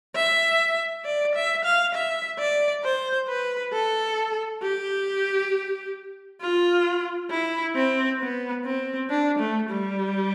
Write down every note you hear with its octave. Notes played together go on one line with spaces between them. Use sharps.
E5
D5
E5
F5
E5
D5
C5
B4
A4
G4
F4
E4
C4
B3
C4
D4
A3
G3